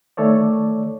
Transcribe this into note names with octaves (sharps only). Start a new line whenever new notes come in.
D#3 A3 A4 C#5 D5